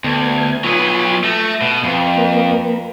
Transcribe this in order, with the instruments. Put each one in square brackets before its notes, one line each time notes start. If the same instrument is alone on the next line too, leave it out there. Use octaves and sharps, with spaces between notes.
[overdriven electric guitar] D2 [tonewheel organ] B3 G#6
[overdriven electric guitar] F#3 B3 [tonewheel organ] F4 G#5 B5
[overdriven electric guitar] A3 [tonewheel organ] A#6
[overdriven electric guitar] B2
[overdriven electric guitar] F2 [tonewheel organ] B4
[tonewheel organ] A#3 A#4 B4